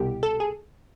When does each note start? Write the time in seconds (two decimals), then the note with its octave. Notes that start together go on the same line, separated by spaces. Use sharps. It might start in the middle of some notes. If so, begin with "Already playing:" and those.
Already playing: C2 B2 G4
0.23 A4
0.40 G#4